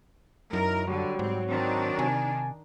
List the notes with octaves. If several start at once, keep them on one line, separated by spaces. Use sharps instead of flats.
F#2 F#3 D#4 E4 A#4
D3 F#3 G3 F#4 C#5
G#2 C4
D#3 C4 D4
C3 G#5